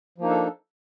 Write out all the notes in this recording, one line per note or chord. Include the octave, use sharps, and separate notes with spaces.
F3 A#3 D4 D#4 A4